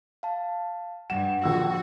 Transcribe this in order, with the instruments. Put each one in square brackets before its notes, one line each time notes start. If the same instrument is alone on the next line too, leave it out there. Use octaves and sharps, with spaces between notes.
[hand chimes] F5 A5
[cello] G2 [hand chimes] F#5 [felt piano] E7
[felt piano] A#1 E6 [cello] F#4